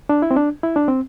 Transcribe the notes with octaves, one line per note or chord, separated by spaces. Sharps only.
D4
E4
C4
D4
E4
D4
C4